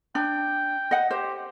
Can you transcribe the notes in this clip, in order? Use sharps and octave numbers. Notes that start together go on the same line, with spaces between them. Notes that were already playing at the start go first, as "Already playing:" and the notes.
D4 G5
D#5 F#5
G4 C5